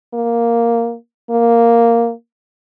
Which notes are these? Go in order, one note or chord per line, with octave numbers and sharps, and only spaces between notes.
A#3
A#3